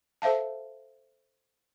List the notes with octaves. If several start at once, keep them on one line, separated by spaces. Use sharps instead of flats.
A4 C5 E5 F5 A5